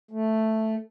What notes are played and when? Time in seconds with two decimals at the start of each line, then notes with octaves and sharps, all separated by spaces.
0.11 A3